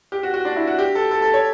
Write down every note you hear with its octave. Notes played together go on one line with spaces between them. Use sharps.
G4
F#4
F#4
D4
E4
F#4
G4
A4
A4
A4
C#5